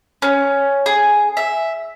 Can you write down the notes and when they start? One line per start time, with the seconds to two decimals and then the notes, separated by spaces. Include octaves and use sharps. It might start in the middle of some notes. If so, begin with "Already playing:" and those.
0.22 C#4
0.86 G#4
1.37 E5